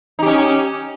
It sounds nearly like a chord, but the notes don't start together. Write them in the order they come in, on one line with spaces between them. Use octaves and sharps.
D#4 G4 C#4